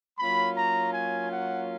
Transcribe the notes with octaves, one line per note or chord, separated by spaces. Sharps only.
F#3 A#3 C#4 F4 B5
A#5
G#5
F#5